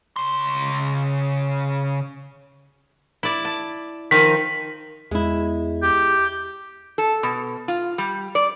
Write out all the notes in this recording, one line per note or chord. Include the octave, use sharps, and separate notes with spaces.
C#3 C6
E4 D5
A5
D#3 F3 D#4 B6
E2 G#3 E4
G4
A4
B2
F4
G3
D5